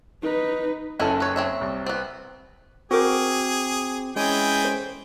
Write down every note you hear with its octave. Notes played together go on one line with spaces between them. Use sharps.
D#4 B4
F#1 F#2 D#3 C#4 E4 A4
B4 C#5
C4 C#5 E5
C2
B3 C4
C4 F#4 G#4 A#4 C5 D6
E3 G#3 C#4 G#4 G5 G#5
C5